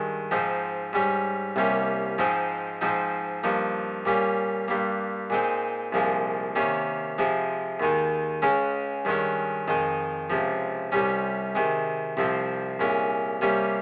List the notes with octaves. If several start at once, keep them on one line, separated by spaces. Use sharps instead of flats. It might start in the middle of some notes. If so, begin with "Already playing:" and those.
Already playing: G2 D#3 G#3
G#2 F3 C4 D#4
G#2 G3 C#4
C2 C3 G3 A#3 C#4
G#2 F3 G#3 C4 D#4
G#2 F3 C4 D#4
G2 F3 A#3 D#4
A#2 G3 A#3 C#4
G2 G3 A#3
A#2 G#3 C4 D#4
C2 A#2 F3 G#3
C3 D#3 A#3 C#4
C3 F3 G#3
D#2 D#3 G#3 D#4
C#2 C#3 G#3 C#4
G2 D#3 G#3 C#4
F2 D#3 G#3 D#4
C#2 C3 F3
C2 C3 G3 C#4
C3 D#3 G#3
C2 C3 F3 C4
C2 A#2 G#3 C#4
C3 G3 A#3 C#4